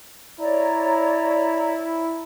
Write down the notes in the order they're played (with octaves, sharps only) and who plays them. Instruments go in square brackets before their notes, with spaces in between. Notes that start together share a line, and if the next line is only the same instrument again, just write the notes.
[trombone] E4 [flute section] C#5 D5 A#5